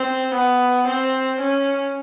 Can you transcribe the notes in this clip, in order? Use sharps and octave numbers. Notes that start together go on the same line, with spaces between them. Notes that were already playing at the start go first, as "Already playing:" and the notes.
Already playing: C4
B3
C4
C#4